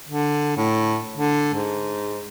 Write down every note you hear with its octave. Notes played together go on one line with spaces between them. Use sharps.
D3
A2
D3
G#2